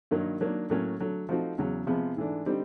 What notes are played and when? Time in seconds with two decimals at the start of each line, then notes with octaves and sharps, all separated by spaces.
0.11 G2 D#3 F#3 A#3 D#4
0.41 D#3 F#3 A#3 D4
0.70 A2 F#3 A#3 C#4
1.00 D3 F#3 A3
1.29 F3 A3 C4 D#4 F#4
1.58 E2 C#3 F#3
1.87 C3 F3 G#3 B3
2.17 G#2 E3 A3 D4
2.46 D3 G3 C4 D#4 G4